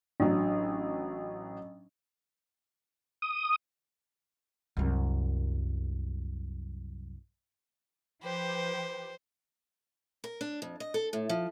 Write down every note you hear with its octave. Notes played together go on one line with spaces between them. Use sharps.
A1 F#3 D4
D#6
C2 F#2
F3 G4 B4 C5
A#4
D4
F2
D#5
A4
A2
F3